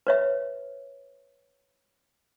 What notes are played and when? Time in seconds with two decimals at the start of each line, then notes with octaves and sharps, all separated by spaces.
0.07 B4 C#5 E5